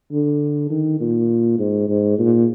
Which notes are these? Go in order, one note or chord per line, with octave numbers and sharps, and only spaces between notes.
D3
D#3
A#2
G#2
G#2
A#2